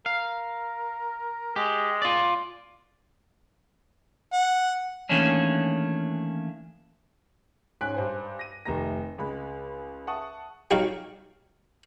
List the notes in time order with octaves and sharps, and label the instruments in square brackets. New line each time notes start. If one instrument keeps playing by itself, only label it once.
[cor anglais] A#4 [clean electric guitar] F5
[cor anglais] G#3 [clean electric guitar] G4
[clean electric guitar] F4 D5
[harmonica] F#5
[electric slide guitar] D#3 E3 A3 A#3 C#4 D4
[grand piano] G#2 C#4 G#5 F#6 B6 D7
G2 C5 G#5
A#6 D#7
F1 D#3 A3 A#5 A#6
C#2 G#3 B5
E5 F#5 A5 C#6 D#6
[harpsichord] F#3 G3 D#4 F#4 F5